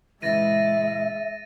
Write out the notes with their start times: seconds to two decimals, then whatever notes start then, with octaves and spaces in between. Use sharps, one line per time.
0.22 A#2 C#3 E3 G#3 E5 A6 A#6 D#7